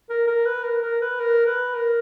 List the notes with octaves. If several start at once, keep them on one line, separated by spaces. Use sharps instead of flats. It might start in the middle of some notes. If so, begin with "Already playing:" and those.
A#4
A#4
B4
A#4
A#4
B4
A#4
B4
A#4